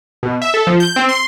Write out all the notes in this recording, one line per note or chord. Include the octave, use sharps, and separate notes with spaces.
B2
E5
A4
F3
G6
C4
C6